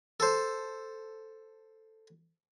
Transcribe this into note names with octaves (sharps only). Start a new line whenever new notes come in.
A4 C5